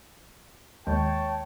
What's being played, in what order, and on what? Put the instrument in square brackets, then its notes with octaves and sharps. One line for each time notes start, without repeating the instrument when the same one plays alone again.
[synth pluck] D#2 D#3 G#3 [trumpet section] C#5 G5 A5